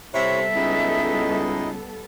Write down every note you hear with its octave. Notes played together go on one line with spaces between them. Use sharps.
C3 G3 B3 E4 A4 C#5 E5
C#2 D#4 E4 D#5